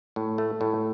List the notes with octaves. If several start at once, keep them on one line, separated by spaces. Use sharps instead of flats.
A2
A3
A2